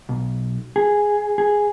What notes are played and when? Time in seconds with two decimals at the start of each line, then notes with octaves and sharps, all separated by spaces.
0.09 B1
0.76 G#4
1.38 G#4